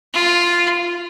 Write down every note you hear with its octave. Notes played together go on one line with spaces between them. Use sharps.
F4